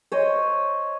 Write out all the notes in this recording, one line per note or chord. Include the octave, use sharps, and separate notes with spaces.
C5 C#5 D#5